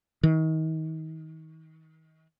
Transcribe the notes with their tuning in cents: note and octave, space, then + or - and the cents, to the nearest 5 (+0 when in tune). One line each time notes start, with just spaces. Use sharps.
D#3 +35